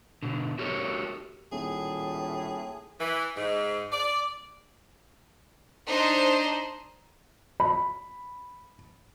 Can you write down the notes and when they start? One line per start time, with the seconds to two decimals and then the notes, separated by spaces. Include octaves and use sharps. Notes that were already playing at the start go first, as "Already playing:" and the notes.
0.23 B2 D3
0.59 F#4 G4 A4 A#4 C#5
1.52 D#1 A2 G#4
3.00 E3
3.37 G#2
3.92 D5
5.87 D4 D#4 C5
7.60 B5